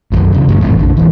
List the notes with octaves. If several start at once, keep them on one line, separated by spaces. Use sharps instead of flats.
B1 F#2 D#3 F#3
E1 C#3
D2 G2 A3
D#1 A1 F2
F1 A#1 D3
D#1 E3